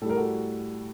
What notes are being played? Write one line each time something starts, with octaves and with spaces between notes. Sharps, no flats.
A2 G3 A4 A#4
F#4 A4